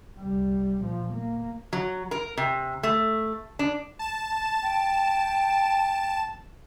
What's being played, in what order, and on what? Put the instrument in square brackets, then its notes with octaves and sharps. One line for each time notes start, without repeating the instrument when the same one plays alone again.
[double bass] C2 G3
A#2 F3
A#3
[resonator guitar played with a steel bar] F#3
A#4
C3
A3
D4
[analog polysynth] A5 E7
[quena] G5